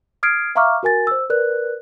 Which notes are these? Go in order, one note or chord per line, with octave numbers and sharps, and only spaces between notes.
D#6 F6 G#6 C7 D7
E5 F5 A#5 C#6 D6 F6
F#4 A#4 G#5 A6
C5 E6
A#4 B4 D5 F#6